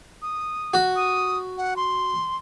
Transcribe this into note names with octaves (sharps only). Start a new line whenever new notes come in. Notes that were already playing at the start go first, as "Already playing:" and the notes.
D#6
F#4
D#6
F#5
C6